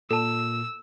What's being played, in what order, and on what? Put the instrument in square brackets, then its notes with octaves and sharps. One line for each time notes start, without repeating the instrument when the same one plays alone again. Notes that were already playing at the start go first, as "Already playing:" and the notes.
[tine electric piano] A#2 [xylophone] A4 A5 [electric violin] E6